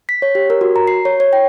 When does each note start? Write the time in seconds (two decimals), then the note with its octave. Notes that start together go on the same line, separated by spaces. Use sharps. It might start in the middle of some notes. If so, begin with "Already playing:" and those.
0.09 B6
0.22 C#5
0.35 G4
0.50 A#4
0.61 F#4
0.76 A#5
0.87 C7
1.05 C#5
1.20 C#5
1.33 G5